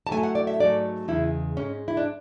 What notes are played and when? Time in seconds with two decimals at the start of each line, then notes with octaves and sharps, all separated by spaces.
0.07 A5
0.11 A2 F#3 A3 G#5
0.23 F#5
0.35 D5
0.47 E5
0.60 G#2 F#3 A3 D5
1.08 E2 C#3 G#3 E4
1.57 G#2 G#3 C#4
1.88 E4
1.97 D4